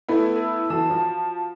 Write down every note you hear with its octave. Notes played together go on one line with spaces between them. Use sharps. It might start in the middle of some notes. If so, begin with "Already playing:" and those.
A3 B3 E4
A4
E3 F#4 A5
F3